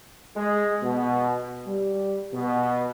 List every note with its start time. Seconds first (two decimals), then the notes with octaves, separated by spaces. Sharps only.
0.36 G#3
0.82 B2
1.67 G3
2.33 B2